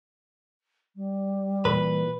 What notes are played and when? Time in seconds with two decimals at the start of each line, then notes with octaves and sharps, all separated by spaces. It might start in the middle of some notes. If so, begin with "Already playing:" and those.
0.96 G3
1.65 A#2 E3 B4